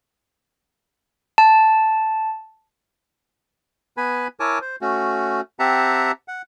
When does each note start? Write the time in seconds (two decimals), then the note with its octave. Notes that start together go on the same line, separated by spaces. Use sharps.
1.38 A5
3.97 B3 B4 G#5 B5
4.40 E4 A#4 C#5 G#5 A5 D6
4.61 C5
4.81 A3 C#4 F#4
5.59 C4 G4 E5 F#5 A5 A#5
6.28 F#5